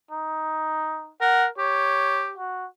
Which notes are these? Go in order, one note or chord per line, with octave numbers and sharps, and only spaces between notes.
D#4
A#4 F#5
G4 C#5
F#4